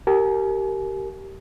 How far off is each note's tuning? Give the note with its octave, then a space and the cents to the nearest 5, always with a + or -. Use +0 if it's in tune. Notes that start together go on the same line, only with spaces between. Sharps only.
G4 -20 A#4 -20 G#5 +40